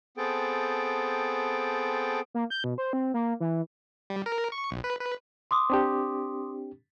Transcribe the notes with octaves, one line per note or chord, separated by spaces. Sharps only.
B3 C4 G#4 A4 G5 A5
A#3
G6
B2
C5
C4
A#3
E3
G3
A#4
C#6
B1
B4
B4
C6 D6 D#6
C4 D4 G4